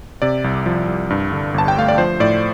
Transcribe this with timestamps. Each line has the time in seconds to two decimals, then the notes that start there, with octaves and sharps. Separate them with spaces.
0.22 C3 D5
0.44 C2
0.66 F3
0.87 C2
1.10 G2
1.32 D3
1.54 G1 A5
1.68 G5
1.77 A3 F5
1.88 D5
1.98 F3 C5
2.20 A2 D5